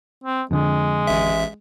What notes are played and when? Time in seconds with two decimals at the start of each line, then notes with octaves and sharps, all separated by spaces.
0.24 C4
0.51 F2 D3 G#3
1.07 A1 E5